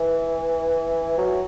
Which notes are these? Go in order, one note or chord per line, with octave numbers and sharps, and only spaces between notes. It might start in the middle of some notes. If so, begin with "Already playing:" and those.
Already playing: E3
F#3